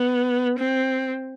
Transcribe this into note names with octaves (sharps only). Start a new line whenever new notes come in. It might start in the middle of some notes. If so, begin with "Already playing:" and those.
Already playing: B3
C4